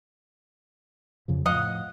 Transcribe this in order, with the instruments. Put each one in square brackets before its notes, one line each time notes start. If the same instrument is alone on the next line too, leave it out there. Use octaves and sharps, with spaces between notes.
[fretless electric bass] F2 C#3 F3
[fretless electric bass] A2 F3 [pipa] D#5 F5 F#5